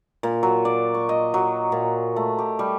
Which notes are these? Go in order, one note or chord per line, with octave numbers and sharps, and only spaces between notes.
A#2
F#3
D5
C#6
D#5
F#3
A#2
A3
G4
G3